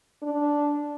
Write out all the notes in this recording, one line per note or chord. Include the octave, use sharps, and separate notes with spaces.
D4